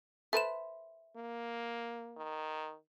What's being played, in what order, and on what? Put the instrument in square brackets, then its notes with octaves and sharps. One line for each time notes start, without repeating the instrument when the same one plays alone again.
[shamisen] A4 B4 C5 [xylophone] E5 E7
[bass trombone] A#3
[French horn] D#3